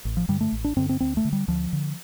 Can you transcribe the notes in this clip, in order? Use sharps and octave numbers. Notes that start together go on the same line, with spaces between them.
A1
F3
G2 D3 G3
A3
A1
D4
G2 D3 C4
C4
D2 C4
A3
D3
G3
D2 F3
D3